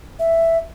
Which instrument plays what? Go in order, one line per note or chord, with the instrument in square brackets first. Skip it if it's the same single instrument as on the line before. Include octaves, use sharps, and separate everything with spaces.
[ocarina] E5